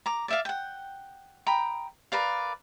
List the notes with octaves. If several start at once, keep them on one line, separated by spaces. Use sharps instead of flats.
A#5 D6
D5 E5 F5
F#5 G5
G5 A#5 B5 D#6
A#4 B4 D5 F5